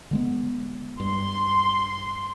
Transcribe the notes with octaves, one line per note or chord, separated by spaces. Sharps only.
D3 G#3 B3
G2 C6